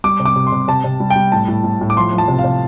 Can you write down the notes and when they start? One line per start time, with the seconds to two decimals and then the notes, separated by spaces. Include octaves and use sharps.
0.04 G3 D6
0.20 C3
0.25 D6
0.36 C3
0.47 C6
0.52 C3
0.68 C3 A5
0.84 C3
1.00 G3
1.10 G5
1.16 G3
1.32 A2 A5
1.48 A2
1.64 A2
1.81 A2
1.90 D6
1.97 F3 C6
2.13 F3
2.18 A5
2.28 C3
2.39 F5
2.44 C3